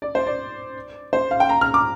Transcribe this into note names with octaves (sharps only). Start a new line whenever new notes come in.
D5
C5
D5
C5
F5
G5
A#5
F6
D6